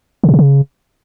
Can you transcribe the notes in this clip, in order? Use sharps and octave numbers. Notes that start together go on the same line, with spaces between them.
C#3
B2
C3
C#3